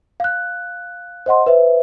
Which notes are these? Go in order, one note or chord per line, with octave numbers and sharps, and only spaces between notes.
F5 F#6
C5 D#5 F#5 C6
B4 C5 E5